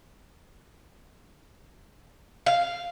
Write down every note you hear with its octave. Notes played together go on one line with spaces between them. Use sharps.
F5